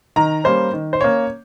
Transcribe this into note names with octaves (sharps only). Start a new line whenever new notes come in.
D#3 A#5
G3 A#3 C#4 C5
D#3
C5
A#3 C#4 C#5